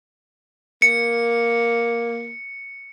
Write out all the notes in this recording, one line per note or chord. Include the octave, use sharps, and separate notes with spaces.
A#3 C#7